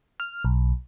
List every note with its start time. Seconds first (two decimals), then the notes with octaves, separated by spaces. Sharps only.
0.20 F6
0.45 B1